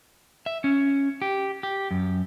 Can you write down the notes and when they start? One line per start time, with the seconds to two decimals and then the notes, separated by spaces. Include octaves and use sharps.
0.46 E5
0.64 C#4
1.22 G4
1.63 G4
1.91 F#2